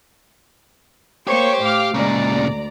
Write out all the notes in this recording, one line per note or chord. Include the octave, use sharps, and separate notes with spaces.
A#3 G4 C5 C#5 C#6
A2 F5 D6 F6
A#2 C#3 G#3 D5 A#5
D2